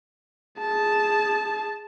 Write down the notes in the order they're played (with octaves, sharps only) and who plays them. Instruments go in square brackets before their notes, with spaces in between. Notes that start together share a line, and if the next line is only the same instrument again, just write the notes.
[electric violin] G#4 A5